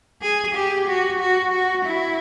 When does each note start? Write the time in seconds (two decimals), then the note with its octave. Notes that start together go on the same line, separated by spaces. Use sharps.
0.22 G#4
0.55 G4
0.87 F#4
1.20 F#4
1.52 F#4
1.85 E4